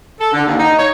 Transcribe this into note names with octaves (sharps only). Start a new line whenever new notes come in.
A4
D3
D#2
D#4
C#5